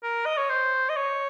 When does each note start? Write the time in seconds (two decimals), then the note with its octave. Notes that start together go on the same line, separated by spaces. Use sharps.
0.03 A#4
0.25 D#5
0.37 C#5
0.50 C5
0.89 D#5
0.96 C#5